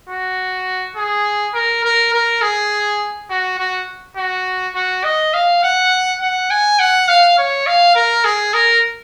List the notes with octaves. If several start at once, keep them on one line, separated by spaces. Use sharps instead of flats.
F#4
G#4
A#4
A#4
A#4
G#4
F#4
F#4
F#4
F#4
D#5
F5
F#5
F#5
G#5
F#5
F5
C#5
F5
A#4
G#4
A#4